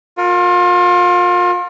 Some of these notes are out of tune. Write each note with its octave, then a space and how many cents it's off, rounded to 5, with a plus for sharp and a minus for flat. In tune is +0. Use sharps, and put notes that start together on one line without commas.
F4 +35 A#4 -15